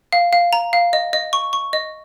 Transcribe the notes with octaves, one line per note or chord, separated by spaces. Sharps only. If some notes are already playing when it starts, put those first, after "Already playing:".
F5
F5
A#5
F5
D#5
D#5
C#6
C#6
D#5